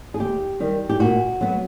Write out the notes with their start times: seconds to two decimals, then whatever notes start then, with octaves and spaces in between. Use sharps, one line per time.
0.14 G#4
0.20 D#2 G4
0.60 D#3 G3
0.89 G4
1.00 A#2 F#4
1.41 F#3 B3